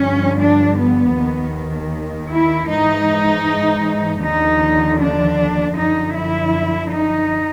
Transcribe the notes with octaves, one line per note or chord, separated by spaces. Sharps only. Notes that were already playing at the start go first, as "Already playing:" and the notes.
Already playing: G2 D3 F3 C#4
D4
B3
D#2 D#3
E4
G#2 E3 D#4
D#2 D3 F3 D#4
D4
F#2 D3 F3 D#4
E4
D#4